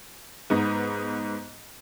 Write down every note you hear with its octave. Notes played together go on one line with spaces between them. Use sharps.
G#2 B3 D#4